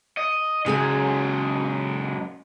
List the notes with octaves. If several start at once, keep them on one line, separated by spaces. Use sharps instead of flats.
D#5
F#2 C#3 G#3 G#4 G#5